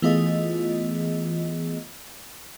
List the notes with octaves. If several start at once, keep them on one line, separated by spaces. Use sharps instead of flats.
E3 A3 B3 F4 G#4 D#5